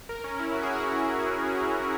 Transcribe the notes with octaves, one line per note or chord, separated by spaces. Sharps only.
A#4
C#4
E4
F#4
G#4
F#4